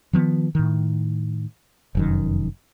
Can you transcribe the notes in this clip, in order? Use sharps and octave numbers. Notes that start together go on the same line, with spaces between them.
D#3 F3 A#3 B3
A2 D#3
F1 F#2 D#3